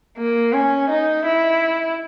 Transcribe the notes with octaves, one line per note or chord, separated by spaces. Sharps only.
A#3
C#4
D#4
E4